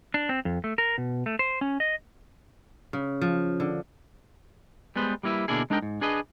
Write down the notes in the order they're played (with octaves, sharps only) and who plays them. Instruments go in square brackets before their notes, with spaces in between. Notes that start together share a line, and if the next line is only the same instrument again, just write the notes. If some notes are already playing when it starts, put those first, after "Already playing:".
[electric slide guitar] D4
C4
F2
A3
A#4
B2
A3
C5
C#4
D#5
[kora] C#3
F3
D3
[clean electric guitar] G3 G#3 B3 B4 C5
G3 A#3 E4 B4 E5
B2 D3 A#3 D4 E4 G#4
G#3 D4 D#4 A#4 G5
G#2
D4 G#4 B4 D#5